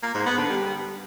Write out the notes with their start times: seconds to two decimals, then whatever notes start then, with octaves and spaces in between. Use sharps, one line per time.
0.03 A#3
0.14 G#2
0.26 B3
0.38 D3
0.50 G3